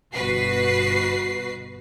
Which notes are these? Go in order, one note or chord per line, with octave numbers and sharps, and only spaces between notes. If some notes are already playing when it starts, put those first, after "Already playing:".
G1 B2 F#4 B4 C7